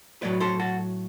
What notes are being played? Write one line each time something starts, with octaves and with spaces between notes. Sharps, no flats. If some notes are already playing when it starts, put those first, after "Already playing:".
A2 F#3 A3 B4 D5
A4 C5
F#4 A4